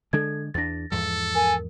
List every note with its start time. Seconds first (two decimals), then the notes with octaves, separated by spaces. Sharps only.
0.13 D3 G#3 D4 A4 G#6
0.54 E2 D4 A6 A#6
0.92 E2 G#2 F3 A4
1.35 A#4 G#5